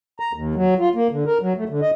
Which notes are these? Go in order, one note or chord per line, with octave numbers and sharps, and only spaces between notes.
A#5
D#2
F#3
F4
A#3
D3
A#4
F#3
A3
D3
D#5